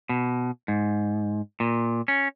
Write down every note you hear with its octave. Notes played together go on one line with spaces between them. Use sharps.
B2
G#2
A#2
C#4